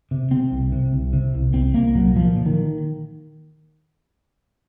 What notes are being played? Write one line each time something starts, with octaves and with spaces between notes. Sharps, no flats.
C3
C3 C4
C2
C3
C2
C3
C2
C2 C4
C2 A#3
A#2 F#3
A#2 F3
A#2
D#3